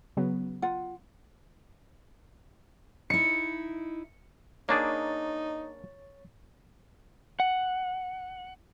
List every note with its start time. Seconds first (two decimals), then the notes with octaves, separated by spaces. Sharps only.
0.17 C#3 F#3 B3
0.62 F4 F#5
3.10 D#4 E4 C#7
4.69 A#3 D4 D#4 G#4 C#5 C#6 A6
7.40 F#5